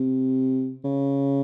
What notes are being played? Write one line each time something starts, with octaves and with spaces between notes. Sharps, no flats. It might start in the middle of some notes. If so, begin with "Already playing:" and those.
Already playing: C3
C#3